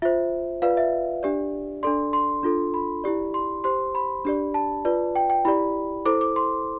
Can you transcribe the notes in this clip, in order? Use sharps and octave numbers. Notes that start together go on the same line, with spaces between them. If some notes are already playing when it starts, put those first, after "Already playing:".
F4 C5 E5
F4 B4 D5 F5
E5
D4 G4 D5
D4 A4 D5 C6
C6
D4 F4 A4
B5
E4 G4 D5
C6
G4 C5 C6
B5
D4 G4 D5
A5
F4 B4 D5
G5
G5
E4 G4 D5 B5
E4 A4 C5 D6
D6
C6